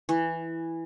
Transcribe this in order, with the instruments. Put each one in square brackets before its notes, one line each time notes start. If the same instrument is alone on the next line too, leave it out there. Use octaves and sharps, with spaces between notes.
[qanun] E3